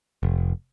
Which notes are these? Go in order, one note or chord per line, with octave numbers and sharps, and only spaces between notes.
F1